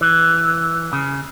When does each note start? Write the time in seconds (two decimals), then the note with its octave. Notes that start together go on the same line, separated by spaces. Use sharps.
0.01 E3
0.93 C#3